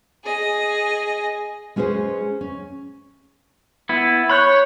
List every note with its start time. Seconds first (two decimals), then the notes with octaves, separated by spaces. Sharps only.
0.24 G#4 D#5
1.76 G#3 C#4 G#4 B4 C5
2.41 C#4
3.89 B3 E4
4.30 C#5 B5 F#6 G6